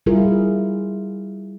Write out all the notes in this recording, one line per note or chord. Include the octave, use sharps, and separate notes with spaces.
G3 E4 F4 G#4 A#4